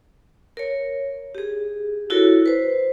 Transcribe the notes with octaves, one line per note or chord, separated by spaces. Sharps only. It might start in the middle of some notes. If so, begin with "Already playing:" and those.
A#4 C#5
G4 G#4
E4 F#4 A4 A#4 C#5
B4 C5